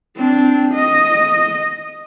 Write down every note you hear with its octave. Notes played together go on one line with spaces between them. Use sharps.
C4 D4
D#5